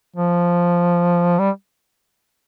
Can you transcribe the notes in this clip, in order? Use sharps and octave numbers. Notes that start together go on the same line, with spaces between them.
F3
G3